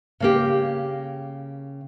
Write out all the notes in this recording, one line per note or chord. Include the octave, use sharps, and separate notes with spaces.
C#3 A#3 G4